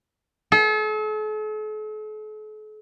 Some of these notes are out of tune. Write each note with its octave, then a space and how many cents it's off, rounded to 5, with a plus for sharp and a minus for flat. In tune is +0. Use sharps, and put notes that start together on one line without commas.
A4 -45